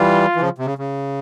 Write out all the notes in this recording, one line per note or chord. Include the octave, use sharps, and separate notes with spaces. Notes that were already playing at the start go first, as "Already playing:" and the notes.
Already playing: E3 G3 F4
E3
C#3 F3
C3
C#3
C#3